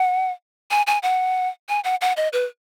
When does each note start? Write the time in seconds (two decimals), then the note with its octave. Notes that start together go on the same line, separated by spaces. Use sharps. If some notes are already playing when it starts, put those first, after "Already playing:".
Already playing: F#5
0.71 G#5
0.87 G#5
1.03 F#5
1.69 G#5
1.84 F#5
2.01 F#5
2.17 D#5
2.33 B4